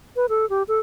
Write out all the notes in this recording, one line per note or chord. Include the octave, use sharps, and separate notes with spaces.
B4
A4
G4
A4